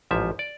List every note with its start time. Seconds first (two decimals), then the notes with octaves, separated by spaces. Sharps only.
0.11 A1 G#2 F3 E5
0.39 D5